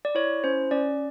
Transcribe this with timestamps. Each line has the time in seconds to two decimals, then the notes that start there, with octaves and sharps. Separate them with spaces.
0.05 D5
0.15 E4 C#5
0.44 C#4 C5
0.71 C#4 D5